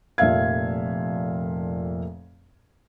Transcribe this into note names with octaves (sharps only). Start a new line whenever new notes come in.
F1 F2 A#2 E5 F5 G#6